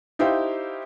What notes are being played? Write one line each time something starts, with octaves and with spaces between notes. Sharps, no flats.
D#4 E4 G4 C5 F5 G5